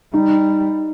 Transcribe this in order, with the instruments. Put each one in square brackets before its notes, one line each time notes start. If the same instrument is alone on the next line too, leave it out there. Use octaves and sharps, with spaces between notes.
[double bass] G3 [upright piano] D#4